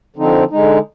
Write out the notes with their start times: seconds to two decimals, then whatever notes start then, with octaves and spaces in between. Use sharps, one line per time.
0.16 D3 F3 C4 D#4
0.51 D3 G#3 D#4